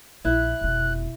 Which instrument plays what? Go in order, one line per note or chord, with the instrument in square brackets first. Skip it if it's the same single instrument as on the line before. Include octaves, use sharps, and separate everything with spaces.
[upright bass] A#1 [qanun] E4 [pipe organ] F#6
[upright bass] F1 B2